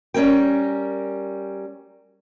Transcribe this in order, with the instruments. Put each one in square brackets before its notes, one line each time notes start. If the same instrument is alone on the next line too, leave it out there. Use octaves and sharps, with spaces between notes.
[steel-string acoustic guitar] G3 C#4 A#4 G5